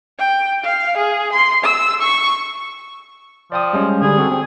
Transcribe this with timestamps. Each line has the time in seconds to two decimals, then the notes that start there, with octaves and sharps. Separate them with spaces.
0.19 G5
0.64 F5
0.97 G#4
1.33 C6
1.64 E6
2.01 C#6
3.52 F3 D5 G5 D#6
3.73 G3 G#3 C#4
4.02 D3 G3 G#4
4.18 C4 F#4 A4
4.31 C4